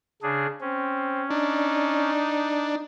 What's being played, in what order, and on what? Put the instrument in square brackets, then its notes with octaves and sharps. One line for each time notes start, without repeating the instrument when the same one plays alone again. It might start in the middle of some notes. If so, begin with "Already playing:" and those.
[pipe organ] C#3 D4 G#4
[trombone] C4 [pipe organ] C#4
[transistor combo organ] D4 [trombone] D#4